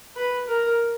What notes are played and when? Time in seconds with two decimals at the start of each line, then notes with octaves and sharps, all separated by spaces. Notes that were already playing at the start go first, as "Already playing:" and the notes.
0.16 B4
0.47 A#4